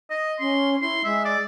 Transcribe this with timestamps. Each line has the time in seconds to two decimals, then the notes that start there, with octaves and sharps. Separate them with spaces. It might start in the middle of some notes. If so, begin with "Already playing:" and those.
0.10 D#5
0.40 C#4 C6
0.82 E4 C6
1.04 G#3 E5
1.25 D5